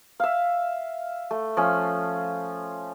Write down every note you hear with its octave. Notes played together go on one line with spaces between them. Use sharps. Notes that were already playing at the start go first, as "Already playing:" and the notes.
E5 F5
A3
F3 C#4